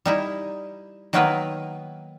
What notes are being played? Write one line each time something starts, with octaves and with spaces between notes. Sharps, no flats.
G3 D#4 E4
D#3 F#3 A#3 B3 A#4 B4